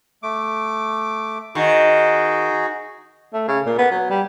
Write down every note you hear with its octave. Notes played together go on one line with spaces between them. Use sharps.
A3 D6
D#3 D#4 F#4 G#4
A3
C#3
A#2
B3
F#3
G3